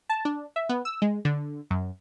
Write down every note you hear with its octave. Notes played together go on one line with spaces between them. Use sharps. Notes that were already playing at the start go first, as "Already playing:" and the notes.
A5
D4
E5
B3
E6
G#3
D3
F#2